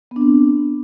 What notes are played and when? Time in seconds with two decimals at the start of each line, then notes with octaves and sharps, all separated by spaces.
0.11 B3
0.16 D4
0.21 C4